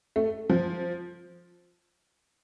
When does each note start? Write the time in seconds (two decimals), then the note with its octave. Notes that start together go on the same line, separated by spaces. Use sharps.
0.16 A3
0.49 F3